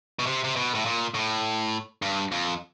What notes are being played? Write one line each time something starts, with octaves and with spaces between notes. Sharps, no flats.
B2
C3
C3
B2
A2
A#2
A2
G2
F2